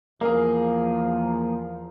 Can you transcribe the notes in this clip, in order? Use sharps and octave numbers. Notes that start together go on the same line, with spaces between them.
E2 F3 A#3 G#4 A#4 F5